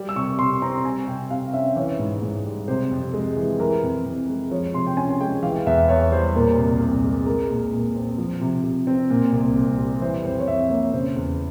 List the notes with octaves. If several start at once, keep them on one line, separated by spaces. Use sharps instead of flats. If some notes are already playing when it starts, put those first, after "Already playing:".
Already playing: G3
E6
C3 C#6
C3 C6
C4 A#5
G3 G#5
C3 G5
C3 F5
C#4 E5
E3 C#5
G#2
G#2
G3
C3 C5
F2
G#3
E3
E3 A#4
F2
F2
G#3
F3 C#5
C3 C6
G5
C#4 G#5
G#5
G#3 G5
E3 F5
E2 E5
E2 C#5
G3 C5
A#2 A#4
C2
C2
G#3
G#3 A#4
A#2
A#2
C4
F3
C3
C3
C4
A#2
C2
C2
G3
E3 C5
F2 C5
C#5
F2 E5
A#3 C#5
C#3 C5
E2